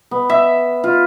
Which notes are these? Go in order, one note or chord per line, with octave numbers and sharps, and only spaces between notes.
B3
E5
F4